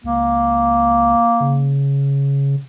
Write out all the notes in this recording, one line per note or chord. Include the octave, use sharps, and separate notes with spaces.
C#2 A#3
C#3